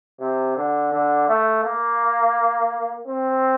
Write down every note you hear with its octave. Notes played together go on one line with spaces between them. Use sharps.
C3
D3
D3
A3
A#3
C4